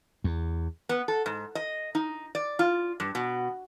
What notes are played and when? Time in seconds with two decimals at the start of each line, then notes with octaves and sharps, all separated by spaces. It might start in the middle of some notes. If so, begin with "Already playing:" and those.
0.24 E2
0.89 B3
1.08 A4
1.26 G#2
1.55 D#5
1.95 D#4
2.35 D5
2.59 F4
3.00 G2
3.15 B2